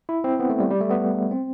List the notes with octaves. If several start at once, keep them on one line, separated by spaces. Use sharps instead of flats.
E4
C4
B3
A3
G3
G3
A3
B3
C4